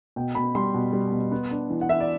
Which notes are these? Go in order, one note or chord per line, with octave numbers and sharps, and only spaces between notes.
B2 G5
B2 B5
G3 C6
B2
G3
B2
B3
D4
E3
F#5
E3 E5
D5